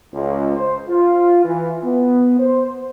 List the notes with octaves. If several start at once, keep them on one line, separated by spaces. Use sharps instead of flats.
C#2
C5
F4
E3
B3
C5